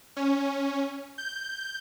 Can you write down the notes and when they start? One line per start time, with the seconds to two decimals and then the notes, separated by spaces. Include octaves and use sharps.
0.16 C#4
1.18 G6